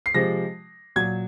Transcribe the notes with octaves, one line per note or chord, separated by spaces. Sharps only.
C7
C3 F3 G#3 A#6
A#2 F#3 G#6